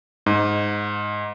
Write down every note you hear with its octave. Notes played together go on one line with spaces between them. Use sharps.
G#2